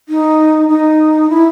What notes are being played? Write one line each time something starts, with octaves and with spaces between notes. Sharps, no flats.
D#4
D#4
E4